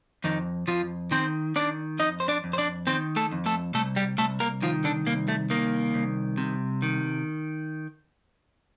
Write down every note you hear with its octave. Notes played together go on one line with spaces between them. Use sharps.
F2 D#3 D#4
F2 F3 F4
D#3 C4 C5
D#3 D4 D5
F2 D#4 D#5
C5
D4 D5
F2
C5
D4 D5
D#3 C4 C5
A3 A4
F2
A3 A4
C2 A3 A4
G3 G4
C2 A3 A4
A#3 A#4
D#3 F3 F4
D3 D4
C2 A#3
A3
D#3 A#3
C2
C3
D#3